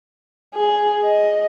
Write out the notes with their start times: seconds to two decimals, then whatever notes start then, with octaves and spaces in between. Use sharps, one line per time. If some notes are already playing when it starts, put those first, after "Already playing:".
0.55 G#4
1.05 D#5